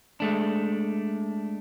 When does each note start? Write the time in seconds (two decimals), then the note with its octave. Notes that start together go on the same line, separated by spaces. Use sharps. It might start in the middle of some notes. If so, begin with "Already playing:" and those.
0.20 G#3 A3 D4